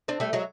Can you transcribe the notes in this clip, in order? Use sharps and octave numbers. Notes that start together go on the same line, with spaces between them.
C4 D4
G3 A3
F#3 G#3